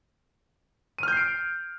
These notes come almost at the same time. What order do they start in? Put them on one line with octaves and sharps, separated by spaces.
D#7 F6 G6 C7 D7